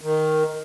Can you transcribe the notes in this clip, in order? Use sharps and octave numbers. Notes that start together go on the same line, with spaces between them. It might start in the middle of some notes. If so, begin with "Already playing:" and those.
D#3